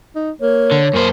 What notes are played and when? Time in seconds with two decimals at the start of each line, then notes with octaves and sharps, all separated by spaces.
0.15 D#4
0.41 A#3 C#5
0.71 D3
0.93 F#2 A#3 C5